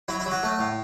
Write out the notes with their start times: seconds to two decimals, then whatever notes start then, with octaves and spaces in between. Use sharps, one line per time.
0.08 F#3 E4
0.20 E4
0.26 F#3
0.31 F#4
0.43 A3
0.59 A2